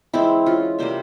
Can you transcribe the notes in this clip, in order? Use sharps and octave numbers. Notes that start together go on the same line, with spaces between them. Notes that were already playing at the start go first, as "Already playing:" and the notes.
E3 G#3 C4 E4
C#4 F4
C3 G3 A#3 C5 E5